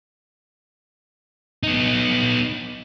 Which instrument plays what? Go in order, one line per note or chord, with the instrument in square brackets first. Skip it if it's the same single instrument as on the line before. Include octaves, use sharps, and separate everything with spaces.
[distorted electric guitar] B3 D#4